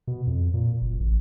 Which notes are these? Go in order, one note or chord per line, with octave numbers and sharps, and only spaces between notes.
B2
F2
A#2
F#1
A1